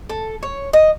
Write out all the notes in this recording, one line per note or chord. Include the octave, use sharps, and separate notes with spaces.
A4
C#5
D#5